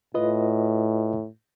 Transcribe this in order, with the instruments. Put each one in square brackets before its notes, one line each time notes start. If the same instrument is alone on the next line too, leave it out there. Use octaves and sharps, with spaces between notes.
[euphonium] A2 [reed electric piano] F4 B4 D#5